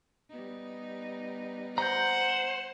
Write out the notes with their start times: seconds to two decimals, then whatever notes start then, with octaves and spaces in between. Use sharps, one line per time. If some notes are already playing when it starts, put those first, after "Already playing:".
0.29 G3 B3 D#4
1.78 C5 F#5 A#5 G6